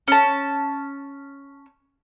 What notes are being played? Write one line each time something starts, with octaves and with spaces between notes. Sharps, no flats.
C#4 A5